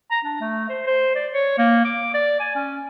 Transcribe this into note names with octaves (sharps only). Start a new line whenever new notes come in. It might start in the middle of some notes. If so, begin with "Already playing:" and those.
A#5
D4
A3
C5
C5
D5
C#5
A#3
D6
D5
G#5
C#4